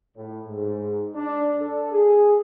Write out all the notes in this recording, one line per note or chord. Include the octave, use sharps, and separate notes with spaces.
A2
G#2
D4
A4
G#4